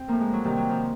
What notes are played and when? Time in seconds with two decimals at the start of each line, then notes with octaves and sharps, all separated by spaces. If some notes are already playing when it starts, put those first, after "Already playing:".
Already playing: C4
0.08 A2 F3 A#3
0.20 G#3
0.33 F#3
0.44 C3 D#3 G3
0.57 F#3
0.69 F3